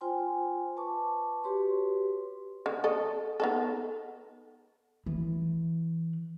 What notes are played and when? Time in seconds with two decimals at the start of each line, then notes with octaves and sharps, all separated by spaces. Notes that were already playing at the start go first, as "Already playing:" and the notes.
0.01 F4 C5 G5 G#5 C6
0.77 B4 A5 C#6 D6
1.44 F#4 G4 B4 C#5 C6
2.66 D3
2.84 A4 D#5
3.40 B3 D#4 A4
5.06 E3